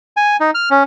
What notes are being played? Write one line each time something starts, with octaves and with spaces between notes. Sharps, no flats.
G#5
D#4
F6
C#4